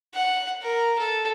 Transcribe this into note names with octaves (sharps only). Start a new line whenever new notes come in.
F#5
A#4
A4